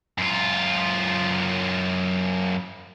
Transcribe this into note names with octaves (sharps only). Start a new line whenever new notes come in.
F#2 F4